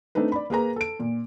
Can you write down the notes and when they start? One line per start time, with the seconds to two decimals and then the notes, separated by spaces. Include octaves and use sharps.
0.15 A3 C4 D4 D#4 B4
0.32 D5 B5
0.50 A#3 G#4 B4 A#5
0.76 A4 D7
1.00 A#2